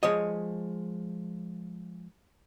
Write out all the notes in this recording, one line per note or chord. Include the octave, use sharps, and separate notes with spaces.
F3 G#3 C#5 D#5